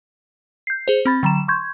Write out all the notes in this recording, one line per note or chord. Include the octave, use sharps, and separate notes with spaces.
G6 C7
G#4 C5
C4 B5 A6
D3 F#3 A#5 E7
C6 C#6 G6 G#6